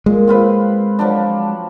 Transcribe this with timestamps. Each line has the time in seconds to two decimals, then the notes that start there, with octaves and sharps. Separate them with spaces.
0.06 A#2 G#3
0.28 C4 F4 B4
0.99 F3 F#3 D4